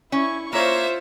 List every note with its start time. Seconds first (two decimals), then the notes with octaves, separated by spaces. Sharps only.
0.12 C#4 E4 C#6
0.53 A#3 F4 C5 C#5 E5